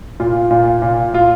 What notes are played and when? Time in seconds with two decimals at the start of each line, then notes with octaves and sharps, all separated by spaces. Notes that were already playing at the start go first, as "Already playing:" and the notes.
0.20 A#2 F4
0.51 A#2
0.82 A#2
1.14 A#2 F4